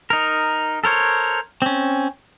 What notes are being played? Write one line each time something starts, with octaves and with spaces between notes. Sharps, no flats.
D#4 A#4
A4 A#4 C5 C#5
C4 C#4